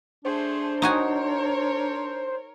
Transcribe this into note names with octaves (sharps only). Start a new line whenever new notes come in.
A3 D4 G#4 C5
D#4 F#4 A#4 C#5 G#5